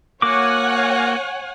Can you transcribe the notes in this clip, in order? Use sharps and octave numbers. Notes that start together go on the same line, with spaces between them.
A#3 F#4 C#5 F#5 G#5 D6